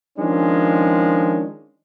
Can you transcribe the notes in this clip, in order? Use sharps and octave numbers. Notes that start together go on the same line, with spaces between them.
D#3 F3 G#3 C#4 D4